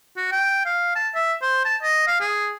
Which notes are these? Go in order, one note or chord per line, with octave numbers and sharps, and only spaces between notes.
F#4
G5
F5
A5
E5
C5
A5
D#5
F5
G#4